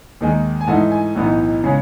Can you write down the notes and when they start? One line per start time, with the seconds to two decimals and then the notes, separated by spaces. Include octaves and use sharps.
0.21 D#2 D#3 G#3 D#4
0.61 G#5
0.67 G#2 E3 A3 D#4 F#5 A5
0.92 G#5
1.15 B1 A2 E3 B3 D#4
1.64 C#3 G#3 C#4